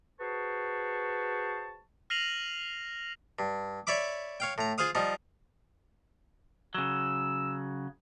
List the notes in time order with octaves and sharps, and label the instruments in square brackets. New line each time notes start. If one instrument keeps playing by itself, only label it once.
[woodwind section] F#4 G#4 B4 C5 A5 C#6
[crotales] F6 A#6 C7 D#7 F7 F#7
[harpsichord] G2
C#5 D5 E5 B5 D6
C#5 F5 G5
A2 A#5
F4 G#4 C5 F5 D#6
F3 G3 D#4
[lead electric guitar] C#3 F#3 [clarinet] E6